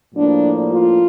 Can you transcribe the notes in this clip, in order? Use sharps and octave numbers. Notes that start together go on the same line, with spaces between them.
A2 F3 A#3 D4
F4